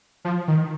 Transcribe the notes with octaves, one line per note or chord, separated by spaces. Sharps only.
F3
D#3